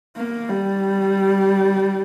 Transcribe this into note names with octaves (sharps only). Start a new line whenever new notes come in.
A#3
G3